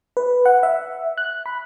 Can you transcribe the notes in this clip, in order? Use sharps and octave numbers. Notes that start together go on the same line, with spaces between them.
B4
F#5
E5
F#6
B5